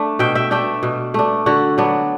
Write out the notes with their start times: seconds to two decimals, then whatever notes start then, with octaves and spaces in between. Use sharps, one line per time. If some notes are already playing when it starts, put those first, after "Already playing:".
Already playing: A3 D4
0.19 B2 E5 G5
0.35 E5 G5
0.51 A3 D4 E5 G5
0.83 B2
1.14 A3 D4
1.46 D3 F#4
1.78 F#3 B3 D4